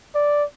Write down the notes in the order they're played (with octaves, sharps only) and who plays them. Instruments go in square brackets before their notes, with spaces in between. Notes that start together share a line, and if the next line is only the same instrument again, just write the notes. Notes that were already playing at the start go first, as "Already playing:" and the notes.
[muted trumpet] D5